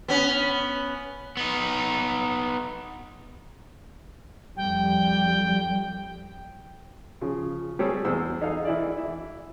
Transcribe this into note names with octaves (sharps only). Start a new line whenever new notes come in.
B3 C#4
B3 D#4
F2 G3 G5
C#3 F3
G3 A3 C4 G#4 A4 C#5
E2 C5 E6
D#4 G#4 A4 F5
E3 E4 D5
E4